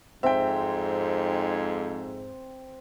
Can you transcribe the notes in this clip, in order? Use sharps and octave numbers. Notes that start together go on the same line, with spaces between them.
F2 G#2 C4 E5 G5